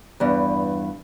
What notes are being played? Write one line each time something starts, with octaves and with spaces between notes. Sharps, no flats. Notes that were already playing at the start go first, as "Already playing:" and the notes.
E2 G2